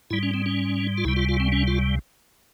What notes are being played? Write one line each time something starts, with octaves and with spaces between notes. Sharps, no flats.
G#2 G3 E4
C#4
C4
C#4
F4
C#2 C3 G3 E4
F4
F4
C4
C#4
F4